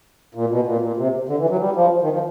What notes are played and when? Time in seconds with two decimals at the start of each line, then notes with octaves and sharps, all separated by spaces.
0.35 A#2
0.50 B2
0.67 A#2
0.81 A#2
0.97 C3
1.29 D3
1.39 E3
1.50 F#3
1.59 G3
1.75 F3
2.02 D#3
2.12 F3